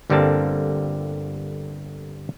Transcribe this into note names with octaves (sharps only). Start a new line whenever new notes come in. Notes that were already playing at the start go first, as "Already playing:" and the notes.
G1 D3 G3 A#3 C4 A5